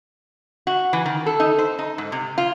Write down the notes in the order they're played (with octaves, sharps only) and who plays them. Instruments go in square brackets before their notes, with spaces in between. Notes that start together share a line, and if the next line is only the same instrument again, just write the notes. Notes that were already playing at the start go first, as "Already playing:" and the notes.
[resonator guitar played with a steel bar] F#4
E3
D#3
A4
D#4
C5
D#4
G#2
C3
F4